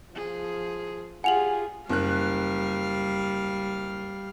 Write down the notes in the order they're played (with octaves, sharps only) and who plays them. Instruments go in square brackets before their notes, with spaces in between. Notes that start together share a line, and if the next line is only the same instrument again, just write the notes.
[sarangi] F3 [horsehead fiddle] G#4
[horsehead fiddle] F4 G4 [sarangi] G#4 [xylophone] F#5 F7 F#7 [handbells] G#5
[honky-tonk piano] F#1 F#6 [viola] G3 F5